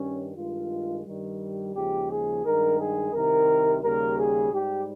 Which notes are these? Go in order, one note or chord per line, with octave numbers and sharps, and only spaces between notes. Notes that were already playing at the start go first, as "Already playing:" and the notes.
Already playing: G2 D#3 G3 C#4
G2 D#3 G#3 F4
G2 D#3 G3
D#2 C#3 F3 G#3 G4
G#4
G2 D#3 G#3 A#4
G#4
C2 C3 D#3 A#4
D#2 C#3 G3 A#4
G#4
G#2 G3 G4